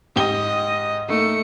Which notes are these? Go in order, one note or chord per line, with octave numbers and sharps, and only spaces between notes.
G#2 G4 D#5 G7
A3 A#3 D#4 C#7